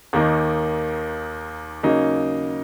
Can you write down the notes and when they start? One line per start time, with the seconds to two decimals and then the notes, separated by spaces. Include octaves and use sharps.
0.13 D#2 D#3 A#3 D#4
1.83 C#3 F#3 A#3 D#4